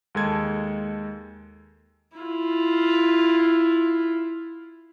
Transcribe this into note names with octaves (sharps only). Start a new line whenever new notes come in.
D#2 G#3 A4 G#6
E4 F4